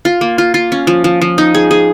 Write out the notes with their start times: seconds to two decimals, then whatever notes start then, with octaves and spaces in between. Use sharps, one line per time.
0.05 F4
0.21 A#3
0.38 F4
0.54 F4
0.72 C#4
0.87 F3
1.04 F3
1.22 F3
1.38 D#4
1.55 G#4
1.71 G#4